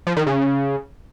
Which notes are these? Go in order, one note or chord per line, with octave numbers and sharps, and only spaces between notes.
F3
D#3
C#3